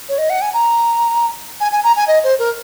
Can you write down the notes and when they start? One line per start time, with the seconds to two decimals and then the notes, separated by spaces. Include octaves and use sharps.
0.09 C#5
0.18 D#5
0.30 F#5
0.41 G#5
0.54 A#5
1.60 G#5
1.72 G#5
1.84 A#5
1.96 G#5
2.08 D#5
2.24 C5
2.39 A#4